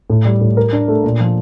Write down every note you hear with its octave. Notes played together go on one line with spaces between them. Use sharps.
A2
G3
A2
A#4
D4
A3
A#2
F3